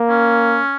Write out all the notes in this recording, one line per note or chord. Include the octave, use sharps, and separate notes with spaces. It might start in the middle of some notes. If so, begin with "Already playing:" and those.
Already playing: A#3
C#4